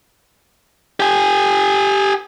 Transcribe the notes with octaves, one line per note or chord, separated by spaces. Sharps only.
G4 G#5